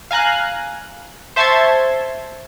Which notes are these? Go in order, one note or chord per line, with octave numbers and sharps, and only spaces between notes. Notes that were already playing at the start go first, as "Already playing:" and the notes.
F5 G#5 A#5 F#6
C5 E5 A5 C6 C#6 G#6